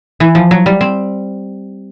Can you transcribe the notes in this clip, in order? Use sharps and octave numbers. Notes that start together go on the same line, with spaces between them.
E3
F3
F#3
G3
C4